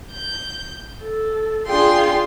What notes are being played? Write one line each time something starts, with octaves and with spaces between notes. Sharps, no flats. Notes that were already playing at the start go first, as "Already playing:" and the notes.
G6
A4
D4 F4 G#4 G5 C6